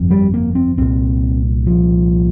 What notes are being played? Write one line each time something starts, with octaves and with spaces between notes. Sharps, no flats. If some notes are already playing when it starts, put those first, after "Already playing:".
Already playing: G1 F2 C3
G3
A#3
C4
C2 A#2 C4
F3